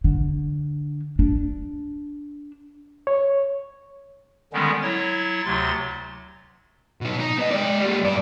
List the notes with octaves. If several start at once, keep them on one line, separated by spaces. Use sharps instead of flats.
D3
D4
C#5
D3 D#3 G3 G#3 B3 C#4
F#3 E4 C#5 A6
D2 C3 F#3 C6 A6
B2 D#4
D#4
B3 D#5
G#3 D5
G3 A#3
G2 D5